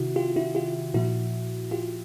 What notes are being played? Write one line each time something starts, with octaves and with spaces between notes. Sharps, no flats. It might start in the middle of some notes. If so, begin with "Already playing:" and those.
Already playing: C3 D#3 E4 F#4
F4 G4
E4 F#4
F4 G4
A#2 F3 E4 F#4
F4 G4